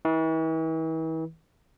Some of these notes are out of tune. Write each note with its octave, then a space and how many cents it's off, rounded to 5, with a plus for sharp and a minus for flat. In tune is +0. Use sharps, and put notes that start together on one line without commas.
E3 -40